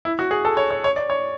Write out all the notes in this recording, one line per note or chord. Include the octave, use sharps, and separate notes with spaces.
E4
F#4
G#4
A4
C#5
C#5
C#5
D5
C#5